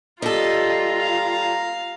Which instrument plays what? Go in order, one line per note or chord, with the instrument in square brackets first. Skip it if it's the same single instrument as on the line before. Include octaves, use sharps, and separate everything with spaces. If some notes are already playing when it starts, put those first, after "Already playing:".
[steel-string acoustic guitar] G3 A4 [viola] F4 [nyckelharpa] D#5 [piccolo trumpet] A#5
[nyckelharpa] F5